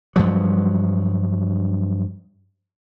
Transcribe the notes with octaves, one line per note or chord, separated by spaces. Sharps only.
G2 F3 F#3